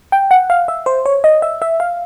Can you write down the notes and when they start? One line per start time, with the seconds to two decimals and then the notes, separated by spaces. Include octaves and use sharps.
0.12 G5
0.31 F#5
0.50 F5
0.68 E5
0.86 C5
1.06 C#5
1.24 D#5
1.42 E5
1.62 E5
1.80 F5